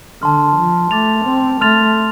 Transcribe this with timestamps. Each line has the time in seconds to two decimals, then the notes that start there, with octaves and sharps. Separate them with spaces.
0.22 D3 A5 C6 F6
0.57 F3
0.91 A3 D6 A6 F7
1.26 C4
1.61 A3 C6 F6 A6 F7